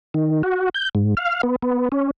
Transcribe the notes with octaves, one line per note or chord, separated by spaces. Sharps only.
D#3
F#4
G6
G#2
F5
B3
B3
C#4